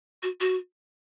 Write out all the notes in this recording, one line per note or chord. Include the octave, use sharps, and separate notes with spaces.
F#4
F#4